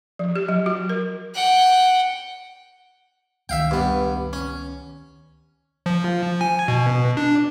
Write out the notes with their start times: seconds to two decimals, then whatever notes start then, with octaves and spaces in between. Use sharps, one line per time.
0.19 F3
0.36 G4
0.49 F#3
0.66 F#4
0.89 A#4
1.35 F#5 G5
3.49 C#2 D#3 E5 F5 G5
3.71 G2 B3
4.33 C#4
5.86 F3
6.41 G#5
6.68 B2
7.17 D4